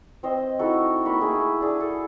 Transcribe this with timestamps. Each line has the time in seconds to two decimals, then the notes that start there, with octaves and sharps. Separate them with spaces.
0.23 C4 C5 D#5
0.59 D#4 E4 F#4 A4
1.05 A#3 B5 C#6
1.19 A3 E4 G#4
1.61 D4 G#4
1.80 A4